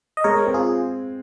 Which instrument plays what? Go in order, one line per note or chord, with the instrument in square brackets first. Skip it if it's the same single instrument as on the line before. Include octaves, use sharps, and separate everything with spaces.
[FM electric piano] D#5
[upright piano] G#3 [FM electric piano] A#4 C#5
[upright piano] C4
[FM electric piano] F4 G#4